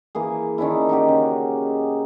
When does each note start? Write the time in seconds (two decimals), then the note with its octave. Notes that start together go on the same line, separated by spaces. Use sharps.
0.15 E3 A#3 G#4
0.58 D#3 C#4 D4 E4
0.89 D#4 F#4 G4
1.08 C#3